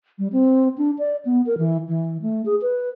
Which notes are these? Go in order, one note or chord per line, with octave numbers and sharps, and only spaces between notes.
G3
C4
D4
D5
B3
A#4
E3
E3
A3
G#4
B4